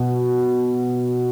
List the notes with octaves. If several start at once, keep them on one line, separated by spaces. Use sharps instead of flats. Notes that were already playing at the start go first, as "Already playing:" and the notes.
Already playing: B2